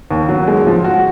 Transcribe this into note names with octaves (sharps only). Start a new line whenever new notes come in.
D#2
F#3
G#3
F3
F#4